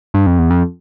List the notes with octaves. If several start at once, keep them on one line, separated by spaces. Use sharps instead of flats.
G2
F2
E2
F2